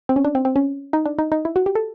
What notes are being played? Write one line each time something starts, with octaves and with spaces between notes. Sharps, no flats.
C4
C#4
D4
C4
C4
C#4
D#4
D4
D#4
D#4
E4
F#4
G4
A4